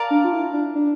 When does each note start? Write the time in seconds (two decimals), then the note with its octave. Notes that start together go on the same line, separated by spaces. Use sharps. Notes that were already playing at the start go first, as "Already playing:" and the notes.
Already playing: A#4 D5 F5 A5
0.10 D4
0.24 F4
0.33 E4
0.53 D4
0.75 D4